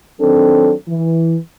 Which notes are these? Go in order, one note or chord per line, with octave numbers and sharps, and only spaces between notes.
D#3 F#3 C4 D4 A4
E3